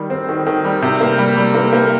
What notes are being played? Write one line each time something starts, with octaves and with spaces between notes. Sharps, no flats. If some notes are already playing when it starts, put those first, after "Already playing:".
Already playing: D#3 G3
C4
D#3
D#3
G3
C3
A#3
G3
G3
A#3
A#3